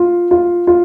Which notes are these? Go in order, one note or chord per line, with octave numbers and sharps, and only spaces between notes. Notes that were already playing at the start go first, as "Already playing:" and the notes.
Already playing: F4
F4
F4